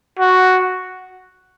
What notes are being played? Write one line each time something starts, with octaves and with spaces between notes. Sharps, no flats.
F#4